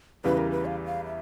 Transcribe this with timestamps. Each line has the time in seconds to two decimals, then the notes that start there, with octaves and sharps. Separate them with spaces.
0.24 E2 C#3 E3 G3 B4
0.38 A#4
0.51 B4
0.66 F5
0.86 F5
1.06 E5